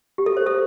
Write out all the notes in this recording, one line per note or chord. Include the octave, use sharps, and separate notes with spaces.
G4
A4
C5
A4